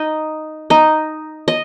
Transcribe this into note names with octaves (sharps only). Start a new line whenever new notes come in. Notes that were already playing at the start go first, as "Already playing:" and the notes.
Already playing: D#4 D#5
D#4 D#5
D#5